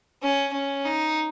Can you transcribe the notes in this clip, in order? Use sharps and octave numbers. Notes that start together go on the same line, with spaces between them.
C#4
C#4
D#4